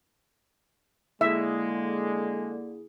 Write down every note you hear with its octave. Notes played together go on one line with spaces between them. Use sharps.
D3 G#3 A#3 E4 G#4 E5